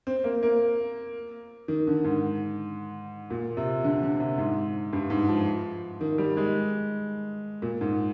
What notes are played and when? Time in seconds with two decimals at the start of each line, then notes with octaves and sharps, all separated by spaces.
0.07 C4
0.24 A#3
0.43 A#3
1.68 D#3
1.87 D3
2.04 G#2
3.30 A#2
3.57 C3
3.84 D3
4.03 D3
4.20 C3
4.38 G#2
4.93 G2
5.10 G#2
5.29 F3
6.01 D#3
6.18 G3
6.37 G#3
7.62 A#2
7.81 G#2